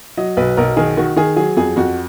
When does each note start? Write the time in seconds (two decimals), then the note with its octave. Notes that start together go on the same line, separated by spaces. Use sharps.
0.17 F#3 D#5
0.37 B1 B4
0.57 B1 A#4
0.77 D#3 G#4
0.97 D#3 F#4
1.16 D#3 G#4
1.36 F#3 G#4
1.56 F2 G#4
1.76 F2 F#4